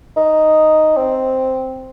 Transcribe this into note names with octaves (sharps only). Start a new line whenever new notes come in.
D#4
C4